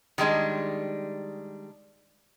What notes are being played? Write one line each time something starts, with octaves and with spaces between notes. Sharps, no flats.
D#3 G3 G#3 D4